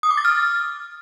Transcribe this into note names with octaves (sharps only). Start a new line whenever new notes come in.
D#6
D6
A6
F6